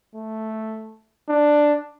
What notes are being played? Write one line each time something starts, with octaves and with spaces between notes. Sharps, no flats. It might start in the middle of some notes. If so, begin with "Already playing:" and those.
A3
D4